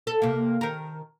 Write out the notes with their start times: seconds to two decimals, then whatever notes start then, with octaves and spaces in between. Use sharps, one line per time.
0.07 A4
0.22 C3 A#3
0.61 D#3 A#4